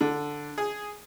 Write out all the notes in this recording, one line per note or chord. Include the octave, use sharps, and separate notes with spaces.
D3
G#4